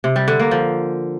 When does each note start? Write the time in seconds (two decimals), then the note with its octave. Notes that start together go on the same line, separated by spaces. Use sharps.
0.04 C3
0.16 G3
0.28 D3
0.40 A#3
0.51 F3